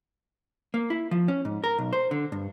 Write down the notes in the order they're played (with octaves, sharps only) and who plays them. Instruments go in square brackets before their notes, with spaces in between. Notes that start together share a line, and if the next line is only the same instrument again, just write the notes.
[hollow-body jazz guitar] A#3
E4
F3
C#4
G#2
A#4
B1
C5
D3
G2